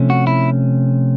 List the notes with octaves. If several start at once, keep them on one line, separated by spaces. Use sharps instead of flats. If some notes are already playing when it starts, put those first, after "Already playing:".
Already playing: C3 F3 A3 C#4
F#4
E4